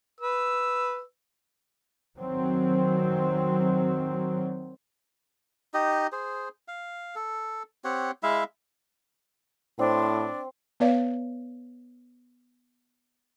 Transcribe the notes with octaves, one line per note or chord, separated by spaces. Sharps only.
B4 E6
D#3 F#3 C4
D#4 G4 D#5
G#4 C5
F5
A4
C4 G4 C#5 F#5
G#3 E4 E5 F5
A2 C4 D4
B3 B4 C#5 D5 F5